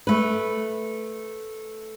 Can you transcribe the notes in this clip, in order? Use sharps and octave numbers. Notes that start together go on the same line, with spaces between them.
A3 B4